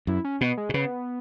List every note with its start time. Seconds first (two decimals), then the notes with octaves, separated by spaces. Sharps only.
0.07 F#2 E4
0.24 C#4
0.41 B2 B3
0.57 G#3
0.69 B2
0.74 C#3 B3